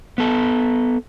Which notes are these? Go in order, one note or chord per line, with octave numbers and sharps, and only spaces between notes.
B3 A4